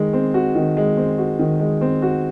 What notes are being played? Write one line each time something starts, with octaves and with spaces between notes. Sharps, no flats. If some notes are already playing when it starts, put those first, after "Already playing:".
Already playing: D#3 G#3
C4
F#4
D#3
G#3
C4
F#4
D#3
G#3
C4
F#4